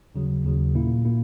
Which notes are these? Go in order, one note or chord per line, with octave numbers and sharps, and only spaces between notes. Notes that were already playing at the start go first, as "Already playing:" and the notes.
D#2 C#3 F#3
D#2 C#3 F#3
A#2 A#3 E4
A#2 A#3 E4